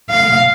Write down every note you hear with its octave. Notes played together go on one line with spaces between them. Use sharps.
F5